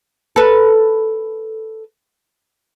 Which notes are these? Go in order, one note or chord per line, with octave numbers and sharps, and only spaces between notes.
A4 B4